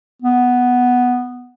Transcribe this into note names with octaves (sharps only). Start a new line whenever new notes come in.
B3